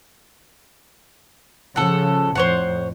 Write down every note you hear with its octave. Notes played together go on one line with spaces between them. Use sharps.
C#3 F3 A4 F#5
F2 A2 C5 C#5 F#5